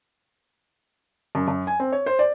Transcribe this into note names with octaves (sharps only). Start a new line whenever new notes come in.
F#2
F#2
G#5
C4
C#5
C5
D5